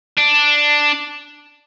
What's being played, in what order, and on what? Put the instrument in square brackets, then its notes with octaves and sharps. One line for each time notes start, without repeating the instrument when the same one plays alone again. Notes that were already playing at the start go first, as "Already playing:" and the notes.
[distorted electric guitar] D4